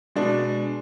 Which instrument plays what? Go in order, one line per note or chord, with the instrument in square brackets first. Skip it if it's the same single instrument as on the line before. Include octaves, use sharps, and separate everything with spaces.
[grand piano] B2 G#3 D4